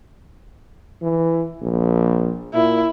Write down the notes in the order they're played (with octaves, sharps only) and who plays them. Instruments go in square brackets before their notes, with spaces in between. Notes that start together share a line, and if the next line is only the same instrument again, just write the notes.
[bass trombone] E3
A#1
[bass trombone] A#2 [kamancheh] E4